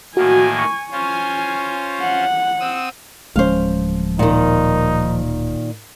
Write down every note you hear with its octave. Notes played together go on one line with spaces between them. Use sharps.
A2 D#3 A#3 F#4 G#5
C#6
C#4 F4 C5 G#5
F#5
C4 D#6 E6
D1 F3 G#3 C#4 C5 F5
A#2 D#3 D#4